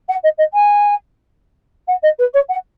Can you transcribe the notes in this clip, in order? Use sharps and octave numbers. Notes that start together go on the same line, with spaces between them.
F#5
D#5
D#5
G#5
F#5
D#5
B4
C#5
F#5